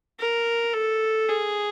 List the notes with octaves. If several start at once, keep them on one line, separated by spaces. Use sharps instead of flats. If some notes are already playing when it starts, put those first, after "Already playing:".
A#4
A4
G#4